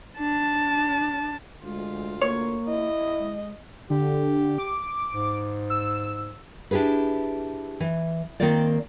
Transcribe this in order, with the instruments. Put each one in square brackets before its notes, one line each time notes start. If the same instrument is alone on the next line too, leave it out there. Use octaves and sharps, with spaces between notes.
[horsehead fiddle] D4 A5
[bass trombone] D2 [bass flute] G#3 [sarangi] F4
[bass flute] A#3 [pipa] C#5
[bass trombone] E4 [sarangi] D#5
[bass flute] G#3
[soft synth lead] D3 [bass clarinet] G4
[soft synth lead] D6
[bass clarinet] G#2
[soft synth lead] E6
[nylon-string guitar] D4 E4 G4 G#4 B4
E3
D#3 A#3 C4 F4 D5